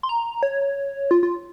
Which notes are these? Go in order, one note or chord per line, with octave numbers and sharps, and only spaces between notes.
C6
A#5
C#5
F4
F4